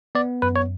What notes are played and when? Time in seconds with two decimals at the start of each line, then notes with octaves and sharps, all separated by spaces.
0.15 B3 D5
0.42 F#2 B4
0.56 C#5